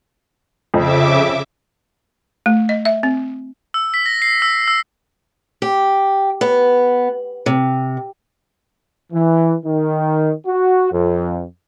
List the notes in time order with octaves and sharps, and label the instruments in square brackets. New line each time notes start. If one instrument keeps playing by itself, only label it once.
[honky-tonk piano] F2 [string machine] C#3 E5 D6
[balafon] A3
D#5
E5
C4
[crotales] E6
B6
A#6
C7
E6
E6
[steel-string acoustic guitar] G4
B3
C3
[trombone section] E3
D#3
F#4
F2